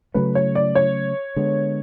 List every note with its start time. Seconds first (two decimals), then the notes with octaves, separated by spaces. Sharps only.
0.14 C#3 F#3 A3 C#4 B4
0.35 C#5
0.55 D5
0.75 C#5
1.36 D3 G#3 B3